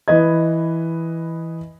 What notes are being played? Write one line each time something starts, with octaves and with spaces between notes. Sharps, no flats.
E3 B4 D#5 G#6